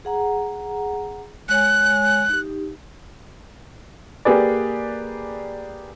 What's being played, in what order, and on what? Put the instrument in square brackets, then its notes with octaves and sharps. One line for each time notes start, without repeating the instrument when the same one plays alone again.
[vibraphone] G#4 F#5 A#5
[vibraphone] G#3 C#5 G#5 [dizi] F#6
[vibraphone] D#4 G4
[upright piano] A#3 G4 G#4 B4 D5